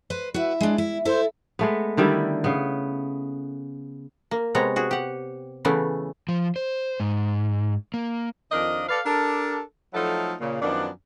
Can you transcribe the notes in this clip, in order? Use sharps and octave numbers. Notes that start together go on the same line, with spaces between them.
B4 C5
E4 F#4 B4
G#3 D4
E4
E4 A4 C5
G#3 A3 B3
D3 D#3 G3 E4
C#3 B3
A#3
C3 G#3 B3 C#5 A#5
F#4 G#4
G4 F#5
C#3 E3 A3 B3 C#4
F3
C5
G#2
A#3
F2 D#3 F3 D4 A#4 D#5
A4 B4 D5 F5
D4 G4 A4 A#4
F3 F#3 A3 D#4 E4 A4
A#2 C#3
F#2 D#3 F3 B3 D4